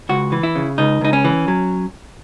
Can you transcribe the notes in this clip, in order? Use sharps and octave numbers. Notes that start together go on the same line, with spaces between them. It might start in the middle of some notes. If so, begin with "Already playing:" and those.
C#2 F#4
E3
E4
C#3
C#2 D#4
C#2 D#4
C#4
E3
F#3